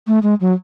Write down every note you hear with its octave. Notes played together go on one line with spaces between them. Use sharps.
A3
G#3
F#3